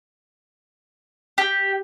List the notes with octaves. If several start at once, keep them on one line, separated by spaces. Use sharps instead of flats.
G4